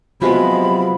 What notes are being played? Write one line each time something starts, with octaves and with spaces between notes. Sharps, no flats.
C3 F3 F#3 G#3 B3 F#4 G4 B5